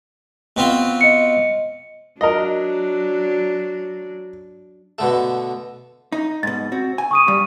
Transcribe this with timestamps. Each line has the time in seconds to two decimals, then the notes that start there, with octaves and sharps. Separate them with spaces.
0.57 B2 C4 F4
1.01 D#5 C#7
2.21 F#3 D4 A#4 D#5
4.99 B2 D3 A3
6.12 D#4
6.43 G#2 B2 A6
6.72 C4 F#4
6.98 G#5
7.11 C#6 D#6 D#7
7.28 G2 G3